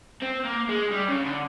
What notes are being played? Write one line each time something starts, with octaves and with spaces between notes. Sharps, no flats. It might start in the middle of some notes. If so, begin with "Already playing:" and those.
C4
A#3
G#3
G3
C#3
D3